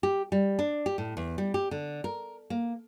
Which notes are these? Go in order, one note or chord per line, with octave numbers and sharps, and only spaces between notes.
G4
G3
D4
G4
A2
E2
G3
G4
D3
A#4
A#3